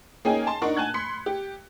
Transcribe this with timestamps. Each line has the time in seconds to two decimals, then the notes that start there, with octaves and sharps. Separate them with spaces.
0.25 A#3 C#4 D#4 G#4 G5 G#5
0.47 A5 C6
0.62 D4 D#4 A#4 F#5 C#6
0.77 G#5 A5 F#6 G#6
0.94 B5 C6 B6 C#7
1.26 G4